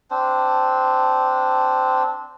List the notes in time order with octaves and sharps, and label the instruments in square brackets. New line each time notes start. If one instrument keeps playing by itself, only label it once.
[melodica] C4 D4 C5